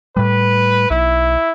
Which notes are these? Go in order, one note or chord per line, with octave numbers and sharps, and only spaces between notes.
A2 G3 B4
B1 E4